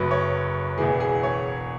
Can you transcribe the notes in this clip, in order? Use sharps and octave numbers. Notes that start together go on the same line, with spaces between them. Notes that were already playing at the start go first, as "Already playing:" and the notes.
Already playing: F#1 F#2 F#3 B4
C#5
E1 E2 E3 G#4
G#4
C#5